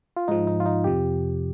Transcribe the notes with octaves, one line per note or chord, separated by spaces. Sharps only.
F4
G#2 F3 D#4
D#4
F4
D#4
F2 C3 F3 G4